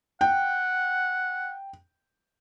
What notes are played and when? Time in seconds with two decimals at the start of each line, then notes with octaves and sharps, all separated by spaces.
0.21 F#5 G5